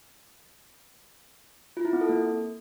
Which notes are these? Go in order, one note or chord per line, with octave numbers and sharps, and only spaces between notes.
F4
E4
C4
A4
A#3